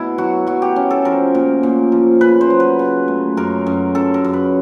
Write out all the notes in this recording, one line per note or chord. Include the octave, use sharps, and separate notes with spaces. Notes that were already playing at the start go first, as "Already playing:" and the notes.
Already playing: B2 E4
F#3 F#4
F#3 F#4
G4
C#4
A4
F3 A#4
A#2
A#2
F3
C#3 B4
C5
F#3
B4
C#3
A3
F#2 A#4
F#2
F#2 A4
A#4
F#2
B4